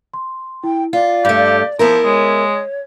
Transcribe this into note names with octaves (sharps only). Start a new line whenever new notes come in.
C6
E4 G5
F4 D5 F5
G2 A3 G4
F3 B3 E4 A#4
G#3 C#5 D#6